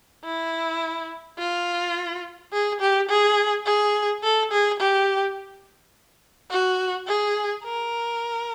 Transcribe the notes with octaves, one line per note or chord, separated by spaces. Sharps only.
E4
F4
G#4
G4
G#4
G#4
A4
G#4
G4
F#4
G#4
A#4